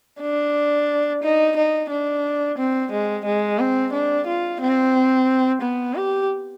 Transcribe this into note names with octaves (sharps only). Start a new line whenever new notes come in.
D4
D#4
D#4
D4
C4
G#3
G#3
C4
D4
F4
C4
B3
G4